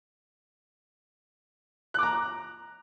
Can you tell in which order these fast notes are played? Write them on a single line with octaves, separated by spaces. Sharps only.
F#6 D6 A#5